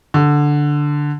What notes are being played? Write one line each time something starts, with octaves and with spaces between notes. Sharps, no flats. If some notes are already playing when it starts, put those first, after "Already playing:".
D3